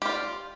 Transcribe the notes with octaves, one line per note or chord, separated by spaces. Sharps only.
F4 G4 D5